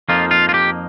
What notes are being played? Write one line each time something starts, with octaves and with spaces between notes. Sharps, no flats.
F2 F3 A#3 D#4 F4
F4
F4
G4